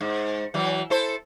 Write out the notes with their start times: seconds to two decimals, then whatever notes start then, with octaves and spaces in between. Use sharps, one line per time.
0.01 G#2
0.54 E3 F#3
0.90 E4 A4 C5